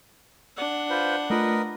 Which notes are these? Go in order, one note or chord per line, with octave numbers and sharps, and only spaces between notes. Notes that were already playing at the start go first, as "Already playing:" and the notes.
D4 F#5
F4 B4 C5
A3 F4 A#4 B4 D#5